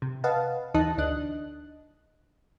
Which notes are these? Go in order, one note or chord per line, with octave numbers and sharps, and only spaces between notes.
C3
B4 D#5 F5 F#5 A5
D#2 E3 D#4 D#5 A5 F#6
D2 D4 D#5 F#6